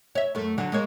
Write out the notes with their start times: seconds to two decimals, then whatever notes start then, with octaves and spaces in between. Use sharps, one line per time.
0.15 C#5 E5
0.35 F#2 A3
0.58 D3 F#3 D4
0.72 G#3 A#3 C#5